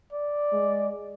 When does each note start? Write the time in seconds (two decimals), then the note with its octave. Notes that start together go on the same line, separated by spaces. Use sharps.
0.13 D5
0.53 G#3